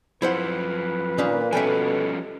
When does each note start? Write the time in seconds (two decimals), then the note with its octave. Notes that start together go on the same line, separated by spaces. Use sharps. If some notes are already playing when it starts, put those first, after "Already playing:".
0.22 F#2 F3 E4 B4 C5 F#5
1.18 A#2 D#3 C#4 D4
1.53 B2 F3 G3 C#4 A4 E5 G5 G#5